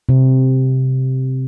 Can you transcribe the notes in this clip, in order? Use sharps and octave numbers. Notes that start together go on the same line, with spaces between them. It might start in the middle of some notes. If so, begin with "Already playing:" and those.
C3